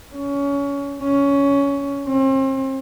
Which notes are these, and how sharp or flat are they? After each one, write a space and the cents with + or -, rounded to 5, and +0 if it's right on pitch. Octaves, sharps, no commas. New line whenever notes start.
C#4 +25
C#4 +15
C4 +40